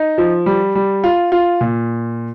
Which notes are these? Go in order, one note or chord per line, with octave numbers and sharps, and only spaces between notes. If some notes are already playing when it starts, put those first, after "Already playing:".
Already playing: D#4
F3
G3
G3
F4
F4
A#2